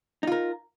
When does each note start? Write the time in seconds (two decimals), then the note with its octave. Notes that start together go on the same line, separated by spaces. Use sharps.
0.23 D#4
0.27 F4
0.32 A#4